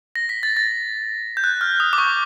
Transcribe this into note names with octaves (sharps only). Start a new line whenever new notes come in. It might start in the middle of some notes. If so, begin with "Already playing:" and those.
A#6
B6
A6
A6
G6
F#6
F6
D#6
D6
C#6